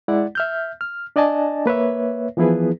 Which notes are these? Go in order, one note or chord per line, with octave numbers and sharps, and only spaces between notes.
G#3 E4 D5 F#5
E5 F6 G6
F6
D4 D5 D#5 G#5 A5
A#3 B4 C#5 E5
E3 F3 B3 E4 G#4 B4